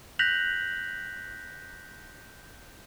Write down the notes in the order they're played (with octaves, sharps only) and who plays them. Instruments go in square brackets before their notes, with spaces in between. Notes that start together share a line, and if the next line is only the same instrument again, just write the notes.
[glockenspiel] F#6 G6 A#6 B6 F7 F#7